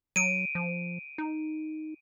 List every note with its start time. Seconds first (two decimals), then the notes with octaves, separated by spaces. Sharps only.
0.16 F#3 D7 D#7
0.55 F3
1.18 D#4